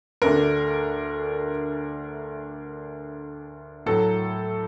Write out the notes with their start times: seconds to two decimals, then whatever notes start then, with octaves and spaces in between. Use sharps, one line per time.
0.22 D2 D3 A3 D4 A#4
3.86 A2 F#3 A3 A4